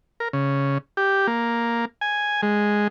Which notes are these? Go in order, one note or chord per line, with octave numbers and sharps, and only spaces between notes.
A#4
C#3
G4
A#3
G#5
G#3